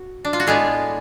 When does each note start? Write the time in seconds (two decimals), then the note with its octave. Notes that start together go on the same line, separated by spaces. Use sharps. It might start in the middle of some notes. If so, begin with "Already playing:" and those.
Already playing: F#4
0.25 D4
0.33 F4
0.40 F#4
0.47 A2 G#3 B3 D4 F4 G#4